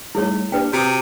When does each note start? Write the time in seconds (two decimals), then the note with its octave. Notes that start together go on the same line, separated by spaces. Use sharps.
0.15 G3 A3 D#4 E4 G#4 C#5
0.52 A#3 D4 G4 B4 G5
0.73 C3 F#4 A#5 D6